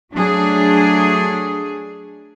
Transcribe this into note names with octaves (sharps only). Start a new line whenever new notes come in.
F#3 A3 D4 G#4